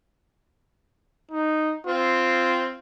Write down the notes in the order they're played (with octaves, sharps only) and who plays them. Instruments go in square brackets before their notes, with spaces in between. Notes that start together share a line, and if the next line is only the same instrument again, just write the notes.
[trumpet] D#4
[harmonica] C4 [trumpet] F4